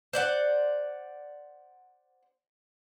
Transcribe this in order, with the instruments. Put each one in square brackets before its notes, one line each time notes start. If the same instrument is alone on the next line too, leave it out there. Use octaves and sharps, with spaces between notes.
[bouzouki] C5 D5 F#5